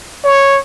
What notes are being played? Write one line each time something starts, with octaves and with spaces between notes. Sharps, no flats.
C#5